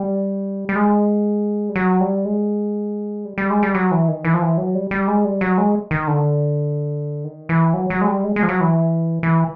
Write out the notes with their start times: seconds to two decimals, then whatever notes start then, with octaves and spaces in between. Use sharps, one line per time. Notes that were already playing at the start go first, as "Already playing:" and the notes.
Already playing: G3
0.69 G3
0.76 G#3
1.69 G3
1.76 F#3
2.00 G3
2.25 G#3
3.25 G3
3.38 G3
3.50 G#3
3.63 G3
3.75 F#3
3.91 E3
4.08 D#3
4.25 E3
4.34 F3
4.42 E3
4.58 F#3
4.75 G3
4.91 G3
5.08 G#3
5.25 G3
5.41 F#3
5.58 G#3
5.91 D#3
6.07 D3
7.24 D#3
7.49 E3
7.74 F#3
7.90 F#3
8.01 G#3
8.08 G3
8.24 G#3
8.36 G#3
8.43 F3
8.49 F#3
8.61 E3
9.23 E3